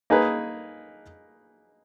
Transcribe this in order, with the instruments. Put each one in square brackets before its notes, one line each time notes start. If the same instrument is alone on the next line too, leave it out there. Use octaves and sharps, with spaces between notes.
[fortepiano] A#3 D#4 G#4 B4